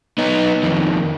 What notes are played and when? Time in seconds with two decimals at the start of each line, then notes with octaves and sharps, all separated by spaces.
0.18 B3 D#4
0.63 F2 D#3